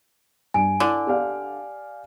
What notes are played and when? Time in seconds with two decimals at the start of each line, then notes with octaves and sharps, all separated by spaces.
0.54 G2 G#5 D7
0.80 D3 E4
1.07 G4 D5 F5